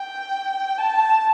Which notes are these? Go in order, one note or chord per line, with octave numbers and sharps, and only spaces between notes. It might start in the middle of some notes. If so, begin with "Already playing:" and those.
Already playing: G5
A5